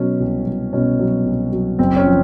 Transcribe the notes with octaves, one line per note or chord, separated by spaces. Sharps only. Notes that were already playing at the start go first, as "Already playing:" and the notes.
Already playing: B2 F#3 C#4
C2
C2
B2 C#4
F#3
C2
F#3
F#1 C4
C#4
F3